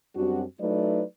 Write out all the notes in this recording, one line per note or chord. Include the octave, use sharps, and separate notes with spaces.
F#2 G3 C4 D4 F#4
F#3 A3 D#4 E4 B4 D5